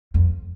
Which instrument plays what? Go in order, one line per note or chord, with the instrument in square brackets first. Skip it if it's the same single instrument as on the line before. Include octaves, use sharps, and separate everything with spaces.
[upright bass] F2